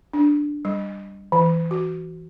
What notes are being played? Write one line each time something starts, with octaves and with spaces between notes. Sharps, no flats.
D4
G3
E3
F#4